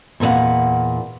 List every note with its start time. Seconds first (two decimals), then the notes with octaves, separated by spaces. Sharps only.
0.20 E2 A#2 E4 F5 F#5